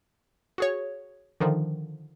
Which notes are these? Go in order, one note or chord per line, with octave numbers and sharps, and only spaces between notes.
F#4 G#4 C#5
D3 D#3 F3